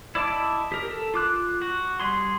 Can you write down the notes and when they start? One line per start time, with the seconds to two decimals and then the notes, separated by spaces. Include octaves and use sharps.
0.15 E4 D5 D#5 A5 D6
0.72 G4 A#4
0.91 A4
1.14 F4 D6 F#6
1.62 F#4
2.00 G3 G#4 C6